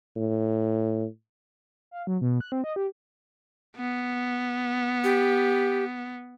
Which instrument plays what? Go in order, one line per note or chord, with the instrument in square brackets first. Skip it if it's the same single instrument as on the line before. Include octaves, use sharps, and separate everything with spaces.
[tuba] A2
[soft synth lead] F5
F#3
B2
F#6
C4
D#5
G4
[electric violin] B3
[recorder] G4